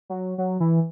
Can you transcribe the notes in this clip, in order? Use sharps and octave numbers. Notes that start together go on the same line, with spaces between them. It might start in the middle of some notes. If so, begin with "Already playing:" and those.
F#3
F#3
E3